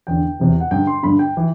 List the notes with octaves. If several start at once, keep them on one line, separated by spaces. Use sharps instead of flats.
E2 D3 G5
E2 C3 E3
F#5
G2 D3 G5
C6
G2 D3 B5
G5
E3